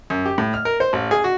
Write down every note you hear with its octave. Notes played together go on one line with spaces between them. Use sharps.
F#2
G4
A2
F6
A#4
C5
A1
G#4
F#4